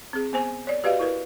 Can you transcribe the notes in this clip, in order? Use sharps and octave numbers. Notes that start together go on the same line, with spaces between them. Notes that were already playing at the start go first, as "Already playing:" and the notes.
C4 G#4
B3 C5 G#5
C#5 D5
F#4 G4 B4 D5 D#5 F5
E4 A#4 B4